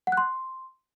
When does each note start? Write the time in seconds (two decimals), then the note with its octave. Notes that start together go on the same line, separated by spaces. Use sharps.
0.07 F#5
0.12 F#6
0.17 C6